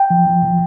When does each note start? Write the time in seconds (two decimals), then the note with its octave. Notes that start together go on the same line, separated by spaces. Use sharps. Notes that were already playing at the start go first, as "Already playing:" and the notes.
Already playing: G5
0.10 F3
0.27 F3
0.44 F3